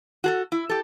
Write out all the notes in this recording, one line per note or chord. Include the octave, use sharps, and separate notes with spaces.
F#4 G#4 A4
E4
G4 A4